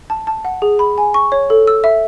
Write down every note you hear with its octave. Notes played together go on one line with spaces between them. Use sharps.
A5
A5
F#5
G#4
B5
G#5
C#6
C#5
A4
E6
E5